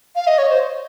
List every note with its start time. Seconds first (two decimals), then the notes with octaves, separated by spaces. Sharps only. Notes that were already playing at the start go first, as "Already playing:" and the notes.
0.16 F5
0.27 D#5
0.38 C#5
0.49 C5